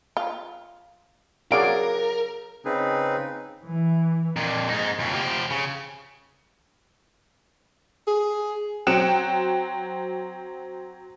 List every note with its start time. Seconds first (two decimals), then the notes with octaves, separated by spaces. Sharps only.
0.17 F4
1.52 C#3 F#3 G#4 A#4 D5 F5 D7
2.65 C#3 C4 D#4 G#4 B4
3.66 E3
4.36 F2 A#2
4.69 G#2 D#4
4.99 F2 C#3
5.13 F3 G4
5.51 C#3
8.07 G#4
8.87 F#3 C4 G5 F#6 C#7 E7